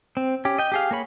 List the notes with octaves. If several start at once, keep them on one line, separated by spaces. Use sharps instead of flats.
C4
C#4 G4
D#5 G5
G4 G#4 F5
A#3 G#4 C#5 B5